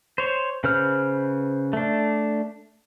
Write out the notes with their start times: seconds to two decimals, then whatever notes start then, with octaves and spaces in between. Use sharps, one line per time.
0.18 C5 C#5
0.64 C#3 B4 C5 F6
1.73 A3 D4